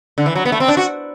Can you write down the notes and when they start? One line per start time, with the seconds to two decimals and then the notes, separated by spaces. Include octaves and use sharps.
0.18 D3
0.26 E3
0.36 F#3
0.45 B3
0.52 A3
0.60 C4
0.68 D4
0.77 F#4